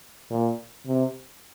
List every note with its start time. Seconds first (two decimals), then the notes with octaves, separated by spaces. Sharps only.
0.31 A#2
0.87 C3